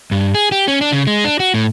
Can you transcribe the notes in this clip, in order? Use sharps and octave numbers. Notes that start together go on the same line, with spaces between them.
G2
G#4
G4
C#4
D4
C#3
G#3
D4
F#4
A2